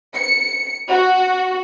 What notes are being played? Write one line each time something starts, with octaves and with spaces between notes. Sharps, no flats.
C#7
F#4